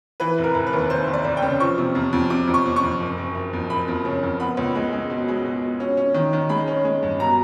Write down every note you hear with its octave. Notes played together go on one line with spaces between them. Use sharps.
E3 B4
F1
A#4
F1
B4
D#2
D#2 C5
D#2
D5
F1
G5
C#3
F3 C#6
C3
F2
F2
C3 D6
F2
C#6
F2
C#6
F2
F#1
F#1
F#1
F2
F#1 B5
F2
C#3
F2
B3 B5
C#2
G#3
G#3
B2
G#3
B2
B2
C#4
C#4
D#3
D#3
G#3 B5
C#4
G#3
G2
B2 A#5